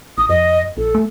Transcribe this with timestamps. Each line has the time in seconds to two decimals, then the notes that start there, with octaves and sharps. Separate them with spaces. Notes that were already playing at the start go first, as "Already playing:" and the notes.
0.18 A1 D#6
0.29 F2 D#5
0.77 A#1 A4
0.95 A3